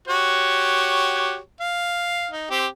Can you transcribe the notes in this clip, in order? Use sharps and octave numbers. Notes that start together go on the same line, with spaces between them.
F#4 G4 C#5
F5
D#4
C4 G4